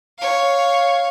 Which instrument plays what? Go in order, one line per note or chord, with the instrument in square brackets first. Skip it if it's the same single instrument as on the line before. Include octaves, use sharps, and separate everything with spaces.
[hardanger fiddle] C#5 F5